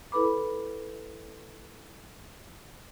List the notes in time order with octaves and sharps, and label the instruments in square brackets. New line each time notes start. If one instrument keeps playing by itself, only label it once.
[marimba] E4 A4 B4 B5 D6